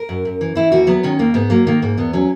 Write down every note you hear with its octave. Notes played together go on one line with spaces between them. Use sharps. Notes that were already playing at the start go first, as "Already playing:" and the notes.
Already playing: A#4
F#2
F#2
E3
E3 E4
D#2 F#4
F#3 B3
D#3 C#4
D#2 A#3
G#2 B3
F#3 A#3
D#3 A#3
G#2 A#3
E2 B3
F#3 C#4